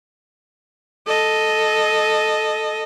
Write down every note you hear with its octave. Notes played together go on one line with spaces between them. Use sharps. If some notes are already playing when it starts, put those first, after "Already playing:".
A4 D#5